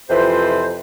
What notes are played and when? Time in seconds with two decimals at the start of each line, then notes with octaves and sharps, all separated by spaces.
0.10 F2 C3 E3 F4 B4 C5